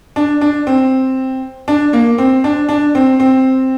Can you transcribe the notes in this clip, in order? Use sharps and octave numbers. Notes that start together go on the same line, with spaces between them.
D4
D4
C4
D4
A#3
C4
D4
D4
C4
C4